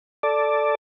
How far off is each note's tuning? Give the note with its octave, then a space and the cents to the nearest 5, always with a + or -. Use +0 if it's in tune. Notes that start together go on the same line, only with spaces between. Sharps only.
A4 +0 D5 +0